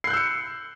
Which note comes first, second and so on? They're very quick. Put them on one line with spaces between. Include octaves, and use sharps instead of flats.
C7 F#6 G6 E6 C#7